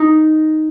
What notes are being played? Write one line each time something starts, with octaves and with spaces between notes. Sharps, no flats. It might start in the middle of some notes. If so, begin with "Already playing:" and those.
Already playing: D#4